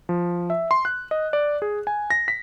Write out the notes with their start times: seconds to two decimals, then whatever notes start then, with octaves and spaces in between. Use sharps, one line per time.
0.09 F3
0.50 E5
0.71 C6
0.85 F#6
1.11 D#5
1.33 D5
1.62 G#4
1.87 G#5
2.10 A#6
2.28 B6